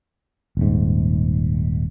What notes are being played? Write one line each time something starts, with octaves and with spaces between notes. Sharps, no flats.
D#1 G#2